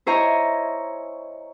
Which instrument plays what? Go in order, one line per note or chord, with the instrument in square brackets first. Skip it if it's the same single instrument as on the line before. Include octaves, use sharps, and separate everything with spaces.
[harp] E4 C5 C#5 D#5 G#5 A#5